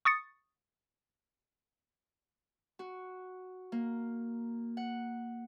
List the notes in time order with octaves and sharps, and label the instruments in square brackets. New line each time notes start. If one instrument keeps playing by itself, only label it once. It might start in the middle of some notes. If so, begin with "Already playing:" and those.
[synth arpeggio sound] C#6 D#6 A6 C#7
[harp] F#4
A#3
F#5